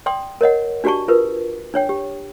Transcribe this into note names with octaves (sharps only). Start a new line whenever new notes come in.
D5 G5 C6 D#6
A#4 C#5 D#5 F#5
D4 F#4 G4 D5 A5 C#6
F4 A#4 B4
D4 C#5 G5
G4